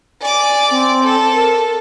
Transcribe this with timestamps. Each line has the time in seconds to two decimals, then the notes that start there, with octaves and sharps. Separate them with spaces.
0.22 D5 G#5 D6
0.70 C4
1.04 A4
1.34 A#4